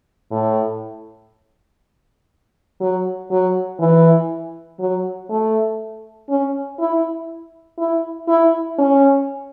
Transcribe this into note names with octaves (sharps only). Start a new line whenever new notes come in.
A2
F#3
F#3
E3
F#3
A3
C#4
E4
E4
E4
C#4